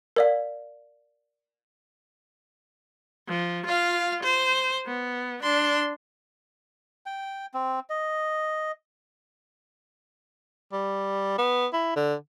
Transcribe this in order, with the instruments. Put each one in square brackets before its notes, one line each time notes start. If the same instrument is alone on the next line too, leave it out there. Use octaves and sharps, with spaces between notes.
[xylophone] A#4 D5 F5
[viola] F3
F4 F5
C5
B3
D4 C6
[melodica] G5
C4
D#5
[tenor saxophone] G3
B3
E4
D3